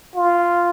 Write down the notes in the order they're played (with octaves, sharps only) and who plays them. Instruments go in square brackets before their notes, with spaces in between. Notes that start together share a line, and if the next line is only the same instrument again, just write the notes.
[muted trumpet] F4